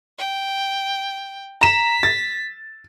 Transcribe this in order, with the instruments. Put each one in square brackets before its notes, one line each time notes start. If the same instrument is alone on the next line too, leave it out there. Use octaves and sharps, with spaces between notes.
[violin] G5
[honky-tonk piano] A#5 E7 [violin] B6
[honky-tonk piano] A6